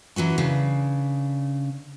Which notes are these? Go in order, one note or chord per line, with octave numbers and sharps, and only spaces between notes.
E3 F#3 C#4 F#4
C#3 D4